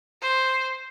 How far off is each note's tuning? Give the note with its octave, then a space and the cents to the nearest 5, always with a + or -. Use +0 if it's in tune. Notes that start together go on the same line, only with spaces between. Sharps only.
C5 +5